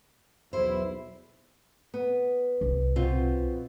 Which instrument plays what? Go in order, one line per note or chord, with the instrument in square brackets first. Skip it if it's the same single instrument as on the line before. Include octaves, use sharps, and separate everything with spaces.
[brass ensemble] B1 E2 E4 [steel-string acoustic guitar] C5
[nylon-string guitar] B3
[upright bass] C2
[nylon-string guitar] B2 C4 F4